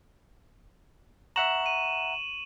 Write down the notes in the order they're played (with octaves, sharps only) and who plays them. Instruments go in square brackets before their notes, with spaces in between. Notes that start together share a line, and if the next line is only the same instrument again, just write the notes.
[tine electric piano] E5 F#5 A#5 [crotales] C#6 E7 F#7
[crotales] D#7